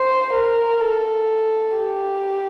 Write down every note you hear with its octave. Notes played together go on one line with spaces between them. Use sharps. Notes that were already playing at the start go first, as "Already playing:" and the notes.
Already playing: C5
A#4
A4
G4